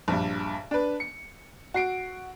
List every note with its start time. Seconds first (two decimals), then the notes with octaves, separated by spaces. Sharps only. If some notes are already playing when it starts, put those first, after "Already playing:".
0.08 A#1 G2
0.71 D4 B4
1.00 C#7
1.74 F#4 C7 D7